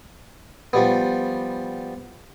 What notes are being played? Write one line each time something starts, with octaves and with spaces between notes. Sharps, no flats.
F3 G3 B3